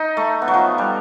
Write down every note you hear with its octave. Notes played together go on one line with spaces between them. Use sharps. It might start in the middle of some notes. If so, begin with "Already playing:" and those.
Already playing: D#4
A3
B3
F#3
F3
G3